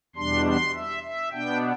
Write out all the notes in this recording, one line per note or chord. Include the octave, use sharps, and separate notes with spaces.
E2 B2 G3 D4 C6
C6
E5
E5
B2 B3 D4 G5